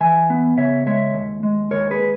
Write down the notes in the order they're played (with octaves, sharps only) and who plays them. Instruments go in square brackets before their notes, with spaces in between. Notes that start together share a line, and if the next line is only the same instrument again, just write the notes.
[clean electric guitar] E3 E5 G#5
B3
C#3 C#5 E5
G#3 C#5 E5
D#2
G#3
D#2 A#4 C#5
G#4 B4